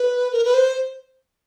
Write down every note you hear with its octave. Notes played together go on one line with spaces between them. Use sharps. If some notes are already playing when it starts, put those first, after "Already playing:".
Already playing: B4
A#4
B4
C5